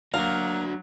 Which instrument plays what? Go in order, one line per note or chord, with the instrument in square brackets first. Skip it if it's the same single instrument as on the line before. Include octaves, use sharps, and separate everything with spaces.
[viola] F#3 [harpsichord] A#3 A#5 [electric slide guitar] D4 F#4 [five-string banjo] F5